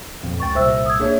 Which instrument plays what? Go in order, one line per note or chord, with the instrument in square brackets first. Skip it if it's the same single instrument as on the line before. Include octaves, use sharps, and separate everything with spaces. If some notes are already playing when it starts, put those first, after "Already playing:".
[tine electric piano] F2 A#2
[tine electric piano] C#2 G5 [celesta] C#6 A6
[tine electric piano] C2 A#2 [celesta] C5 E5 E6
[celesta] D#6 E6 G#6
[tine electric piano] A#3 D4 E5 [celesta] G#4 C#5